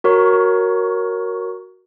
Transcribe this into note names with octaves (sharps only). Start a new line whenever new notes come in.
F#4 A#4 C#5 C#6